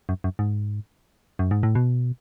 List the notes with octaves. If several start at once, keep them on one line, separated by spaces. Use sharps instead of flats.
F#2
F#2
G#2
F#2
G#2
A2
B2